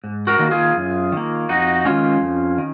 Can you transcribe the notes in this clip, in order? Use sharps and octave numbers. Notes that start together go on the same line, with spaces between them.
G#2
F#4 A#4
D#3 A#3
F4 G#4
F#2
D#3 A#3
F2 D#4 F#4
D#3 G#3 C#4 F4
F2
D#3